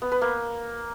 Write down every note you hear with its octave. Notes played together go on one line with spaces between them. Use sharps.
B3
B4
A#3